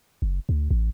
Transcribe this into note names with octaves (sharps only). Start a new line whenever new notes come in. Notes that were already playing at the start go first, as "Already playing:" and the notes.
F#1
D2
A1